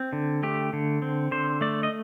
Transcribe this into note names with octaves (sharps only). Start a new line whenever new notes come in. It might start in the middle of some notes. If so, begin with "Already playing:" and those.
Already playing: C4
D3
A3 G4
D3
C4
D3 C5
A3 D5
D#5